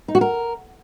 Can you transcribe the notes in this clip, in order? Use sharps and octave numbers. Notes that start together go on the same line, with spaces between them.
D#4
F#4
A#4